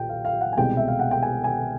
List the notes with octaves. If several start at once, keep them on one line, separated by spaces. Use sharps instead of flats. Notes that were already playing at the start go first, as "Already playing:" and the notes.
Already playing: B1 A#2 F#3 G5
F5
F5
F#5
G#5
C2 B2 G#3 C4 G5
E5
F5
F#5
G5
G#5
G#5